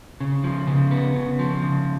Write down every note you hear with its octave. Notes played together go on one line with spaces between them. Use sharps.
C#3
F3
C#3
B3
C#3
F3
C#3